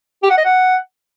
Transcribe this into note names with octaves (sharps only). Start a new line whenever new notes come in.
G4
F#5
D#5
F#5